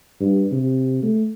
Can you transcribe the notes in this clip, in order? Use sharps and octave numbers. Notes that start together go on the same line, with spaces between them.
G2
C3
A3